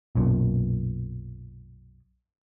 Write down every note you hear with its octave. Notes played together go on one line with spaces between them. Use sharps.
B1 F#2 A#2